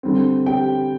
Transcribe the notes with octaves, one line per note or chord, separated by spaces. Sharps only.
D3 G3 C4
G4 G5